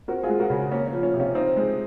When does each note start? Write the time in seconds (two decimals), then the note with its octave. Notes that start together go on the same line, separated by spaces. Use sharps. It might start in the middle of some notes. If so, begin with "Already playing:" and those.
0.08 C4 F#4 A#4
0.23 F4 G#4
0.29 G#3
0.39 F#4 A#4
0.50 C#3
0.72 A#3 C#4
0.87 C#4
0.93 F3
1.03 C#4
1.14 C3
1.19 C#4 F4
1.35 C4 D#4
1.56 G#3